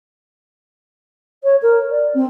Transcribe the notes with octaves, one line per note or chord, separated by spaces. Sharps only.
C#5
A#4
D5
C4